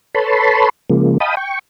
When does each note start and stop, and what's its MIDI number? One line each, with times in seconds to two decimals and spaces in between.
0.15 0.69 69
0.15 0.69 71
0.15 0.69 73
0.15 0.69 81
0.15 0.69 83
0.15 0.69 84
0.90 1.18 49
0.90 1.18 53
0.90 1.18 56
0.90 1.18 58
1.20 1.35 75
1.20 1.35 77
1.20 1.35 79
1.20 1.35 81
1.20 1.35 83
1.20 1.35 87
1.37 1.59 79
1.37 1.59 85